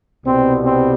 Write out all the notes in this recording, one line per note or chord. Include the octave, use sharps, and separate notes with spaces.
C2 B2 G3 C4
C4